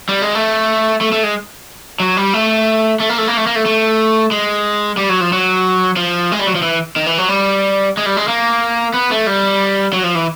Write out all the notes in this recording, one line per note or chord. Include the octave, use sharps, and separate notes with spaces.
G3
G#3
A3
A3
A3
G#3
F#3
G3
A3
A3
A#3
A3
A#3
A3
A#3
A3
A3
G#3
G3
F#3
F3
F#3
F3
G#3
G3
F#3
F3
E3
D#3
E3
F#3
G3
G#3
G3
G#3
A#3
B3
A3
G3
F#3
F3
E3